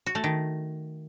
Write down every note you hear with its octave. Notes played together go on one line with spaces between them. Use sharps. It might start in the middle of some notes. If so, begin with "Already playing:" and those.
F#4
A3
D#3